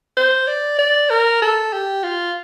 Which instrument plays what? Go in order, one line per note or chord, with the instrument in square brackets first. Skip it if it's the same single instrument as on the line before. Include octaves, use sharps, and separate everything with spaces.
[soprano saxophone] C5
D5
D5
A#4
A4
G4
F4